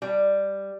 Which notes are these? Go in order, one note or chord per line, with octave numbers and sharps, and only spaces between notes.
G3